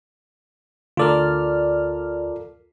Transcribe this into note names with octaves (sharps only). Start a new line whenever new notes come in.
D2 F4 A4 A#4 D5 F6